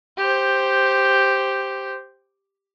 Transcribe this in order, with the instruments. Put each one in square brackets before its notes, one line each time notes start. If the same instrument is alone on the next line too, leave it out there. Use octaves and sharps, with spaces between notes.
[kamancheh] G4 C5